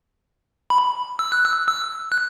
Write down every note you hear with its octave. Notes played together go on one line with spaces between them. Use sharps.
B5
E6
F#6
E6
E6
F#6